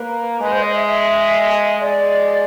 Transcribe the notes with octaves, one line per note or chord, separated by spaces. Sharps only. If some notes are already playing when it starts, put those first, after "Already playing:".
Already playing: A#3 B4
G#3 B4
C5
D#5
E5
E5
G#3 D5